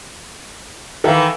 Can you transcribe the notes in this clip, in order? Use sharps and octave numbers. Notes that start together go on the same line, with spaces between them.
D#3 E3 A4 E5 F5